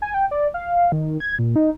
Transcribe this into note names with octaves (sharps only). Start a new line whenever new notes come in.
G#5
G5
D5
F5
D#3
G#6
A#2
D#4